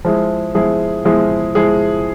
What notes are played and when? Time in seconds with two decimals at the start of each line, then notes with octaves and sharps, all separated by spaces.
0.05 F3 G#3 E4 G#4
0.55 F3 G#3 E4 G#4
1.05 F3 G#3 E4 G#4
1.55 F3 G#3 E4 G#4